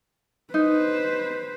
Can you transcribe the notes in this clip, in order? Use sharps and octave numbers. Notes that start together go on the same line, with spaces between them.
D#4 B4 C5